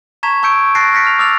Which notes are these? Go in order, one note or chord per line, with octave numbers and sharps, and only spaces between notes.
A5 A#5 C#6 G#6 B6 E7
A5 C#6 E6 G6 C#7 D7
A5 F#6 A6 A#6 C7 D7
F6 G6 A#6 B6 C#7
F6 F7
D6 E6 F6 A6 F7